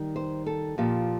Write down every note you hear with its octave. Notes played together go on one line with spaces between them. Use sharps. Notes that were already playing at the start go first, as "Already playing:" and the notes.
Already playing: D#3 G3
C5
A4
A#2 F3 G4